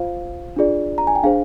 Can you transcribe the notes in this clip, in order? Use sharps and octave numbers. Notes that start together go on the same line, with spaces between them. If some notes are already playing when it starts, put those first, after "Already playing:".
Already playing: F4 C5 F5
D4 F4 G#4 D5
A#5
G#5
G5
D4 G#4 C5 F5